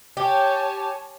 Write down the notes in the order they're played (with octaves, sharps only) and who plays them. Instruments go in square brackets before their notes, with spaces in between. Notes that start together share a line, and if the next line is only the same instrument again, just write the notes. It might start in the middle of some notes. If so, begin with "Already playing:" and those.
[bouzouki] G4 [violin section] C#5 G#5 A5